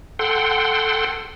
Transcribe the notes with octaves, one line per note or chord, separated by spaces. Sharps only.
A4 F#5 G5 C6